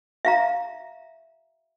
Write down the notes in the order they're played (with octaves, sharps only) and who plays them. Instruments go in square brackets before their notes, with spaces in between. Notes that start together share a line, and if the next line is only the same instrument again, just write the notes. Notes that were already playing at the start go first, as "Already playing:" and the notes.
[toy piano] E5 F5 A#5